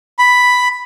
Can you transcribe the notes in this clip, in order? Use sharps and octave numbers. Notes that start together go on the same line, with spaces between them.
B5